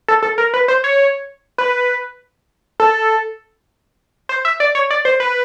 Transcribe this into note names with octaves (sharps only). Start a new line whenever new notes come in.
A4
A4
A#4
B4
C5
C#5
B4
A4
C5
E5
D5
C#5
D5
C5
B4